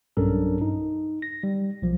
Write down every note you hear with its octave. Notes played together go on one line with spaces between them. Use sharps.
B1 G2 C#4 D4 A4 A#4
D#4
A#6
G3
B1 F3